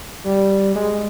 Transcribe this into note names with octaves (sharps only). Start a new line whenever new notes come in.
G3
G#3